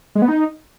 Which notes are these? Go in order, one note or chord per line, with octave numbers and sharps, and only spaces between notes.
G#3
B3
D#4